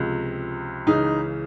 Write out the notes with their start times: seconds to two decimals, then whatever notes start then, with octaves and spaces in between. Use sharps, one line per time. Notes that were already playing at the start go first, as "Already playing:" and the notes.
Already playing: C#2 C3 F3
0.87 C#2 C#3 E3 D#4